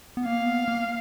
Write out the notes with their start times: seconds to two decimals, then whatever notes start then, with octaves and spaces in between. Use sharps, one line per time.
0.17 B3
0.25 A#3 F5
0.46 B3
0.68 A#3